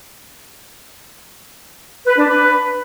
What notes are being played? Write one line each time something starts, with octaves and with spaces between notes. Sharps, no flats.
B4
D4
B4